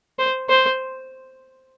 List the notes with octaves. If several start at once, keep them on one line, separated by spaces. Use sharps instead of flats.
C5
C5